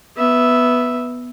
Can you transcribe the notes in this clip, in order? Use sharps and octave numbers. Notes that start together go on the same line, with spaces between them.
B3 E5